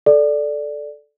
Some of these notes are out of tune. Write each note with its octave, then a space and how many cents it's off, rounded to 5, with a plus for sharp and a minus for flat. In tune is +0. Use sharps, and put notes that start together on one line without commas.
A4 -10 D5 +0